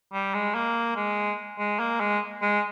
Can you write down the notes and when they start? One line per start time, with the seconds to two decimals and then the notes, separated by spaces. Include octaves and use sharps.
0.13 G3
0.35 G#3
0.55 A#3
0.96 G#3
1.59 G#3
1.79 A#3
2.00 G#3
2.42 G#3